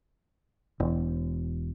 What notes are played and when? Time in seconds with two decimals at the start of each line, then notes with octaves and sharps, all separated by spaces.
0.80 E1